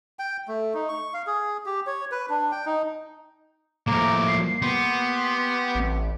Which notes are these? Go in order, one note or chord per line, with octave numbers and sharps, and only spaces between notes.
G5
A3
D#4
C#6
F5
G#4
G4
C#5
B4
D4
G5
D#4
A2 F3 A#3 A#5 D6
C7
B3 G4 C6
A1